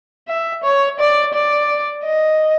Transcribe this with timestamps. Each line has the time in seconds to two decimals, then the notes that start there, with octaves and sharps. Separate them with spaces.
0.28 E5
0.63 C#5
1.00 D5
1.34 D5
2.04 D#5